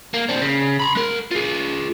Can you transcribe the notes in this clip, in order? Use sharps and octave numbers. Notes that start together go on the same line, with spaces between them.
A#3
C4 D4
C#3
A#5 B5
G#3 A#4
F4 G#4